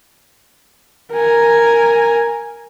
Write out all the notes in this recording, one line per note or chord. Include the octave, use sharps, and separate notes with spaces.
A#4 G#5